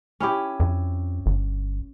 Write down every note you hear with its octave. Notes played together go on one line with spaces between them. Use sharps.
C#4 E4 G4
F2
G1